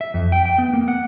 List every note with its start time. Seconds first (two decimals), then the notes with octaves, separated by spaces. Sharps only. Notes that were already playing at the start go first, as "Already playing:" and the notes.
0.01 E5
0.14 F2
0.32 G5
0.45 G5
0.58 B3
0.73 A#3
0.88 F#5